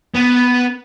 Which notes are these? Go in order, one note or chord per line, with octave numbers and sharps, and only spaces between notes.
B3